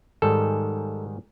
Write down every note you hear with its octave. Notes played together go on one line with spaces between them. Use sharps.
G#2 D#3 G3 A4